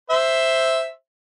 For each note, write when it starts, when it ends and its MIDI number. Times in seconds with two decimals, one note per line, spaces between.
0.10 0.90 72
0.10 0.90 76